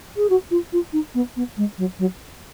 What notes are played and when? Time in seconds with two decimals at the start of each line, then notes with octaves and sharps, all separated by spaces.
0.17 G#4
0.30 F#4
0.51 F4
0.73 F4
0.93 D#4
1.14 B3
1.36 B3
1.57 G#3
1.78 F#3
1.99 F#3